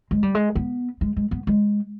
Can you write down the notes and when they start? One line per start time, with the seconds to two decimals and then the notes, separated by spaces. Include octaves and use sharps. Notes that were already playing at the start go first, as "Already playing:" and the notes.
0.11 G#3
0.23 G3
0.35 G#3
0.56 B3
1.01 G#3
1.17 G#3
1.31 B3
1.47 G#3